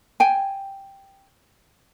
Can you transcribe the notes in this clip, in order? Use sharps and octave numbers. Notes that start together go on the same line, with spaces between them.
G5 G#5